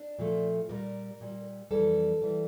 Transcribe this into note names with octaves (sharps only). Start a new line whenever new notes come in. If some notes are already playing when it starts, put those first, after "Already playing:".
Already playing: D4
A#2 F3 A3
A#2 G3 A#4
A#2 G3
F2 E3 G3 A4
E3 G3